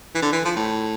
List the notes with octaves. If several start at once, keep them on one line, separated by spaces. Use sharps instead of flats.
E3
D3
E3
F3
A2